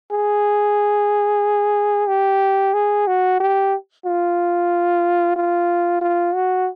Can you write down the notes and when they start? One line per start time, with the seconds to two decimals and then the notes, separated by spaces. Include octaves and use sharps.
0.11 G#4
2.08 G4
2.74 G#4
3.07 F#4
3.40 G4
4.05 F4
5.36 F4
6.01 F4
6.35 F#4